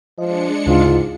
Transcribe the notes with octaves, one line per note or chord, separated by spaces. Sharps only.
F3 G#3 D4 D#5 C#7
D2 G#2 C#3 E4 F4